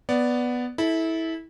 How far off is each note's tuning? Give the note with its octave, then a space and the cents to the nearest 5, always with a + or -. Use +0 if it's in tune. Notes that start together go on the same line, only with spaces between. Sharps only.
B3 +0 D5 -5
E4 -20 A4 -20